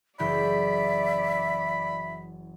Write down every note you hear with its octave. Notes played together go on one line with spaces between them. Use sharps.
F#1 E3 D5 E5 B5 G6